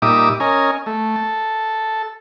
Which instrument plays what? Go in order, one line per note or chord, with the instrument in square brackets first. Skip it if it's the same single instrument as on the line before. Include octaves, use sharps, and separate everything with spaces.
[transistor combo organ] A#2 G3 D#4 E5 D6 D#6
C#4 A#4 D#5 G#5
A3
A4